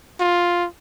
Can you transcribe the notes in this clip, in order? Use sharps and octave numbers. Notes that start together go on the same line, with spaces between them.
F4